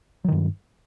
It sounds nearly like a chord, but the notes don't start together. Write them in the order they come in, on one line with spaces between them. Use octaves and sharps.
F#3 D#3 G2